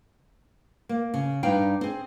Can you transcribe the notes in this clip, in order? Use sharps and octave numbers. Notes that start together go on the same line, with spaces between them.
A#3
C#3
G2 D4 D#4 B4 F5 G5
C4 G#4